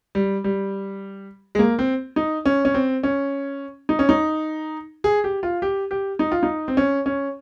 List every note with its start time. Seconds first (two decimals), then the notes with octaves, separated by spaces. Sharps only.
0.15 G3
0.44 G3
1.55 G#3
1.59 A#3
1.79 C4
2.16 D#4
2.46 C#4
2.65 C#4
2.74 C4
3.03 C#4
3.89 D#4
3.99 C#4
4.09 D#4
5.04 G#4
5.24 G4
5.43 F4
5.62 G4
5.91 G4
6.19 D#4
6.32 F4
6.43 D#4
6.68 C4
6.77 C#4
7.06 C#4